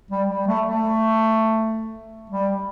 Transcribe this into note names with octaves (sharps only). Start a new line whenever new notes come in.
G3
G3
A3
A3
G3